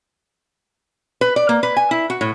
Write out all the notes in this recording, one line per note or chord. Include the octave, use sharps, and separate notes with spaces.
B4
D5
A#3
B4
G#5
E4
F#4
A2